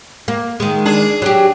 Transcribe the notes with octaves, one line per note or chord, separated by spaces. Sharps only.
A#3
D#3 G#3
D4 G#4
F#3 G4